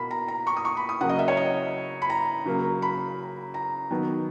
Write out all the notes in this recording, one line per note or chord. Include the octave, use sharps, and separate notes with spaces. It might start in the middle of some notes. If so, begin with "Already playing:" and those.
Already playing: B2 A#3 B5
A#5
A#5
C#6
D#6
C#6
B5
D#6
C#3 F#3 A#3 F#5
D#5
E5
C#5
D#5
B5
A#5
C#3 F#3 A#3
B5
A#5
D#3 F#3 B3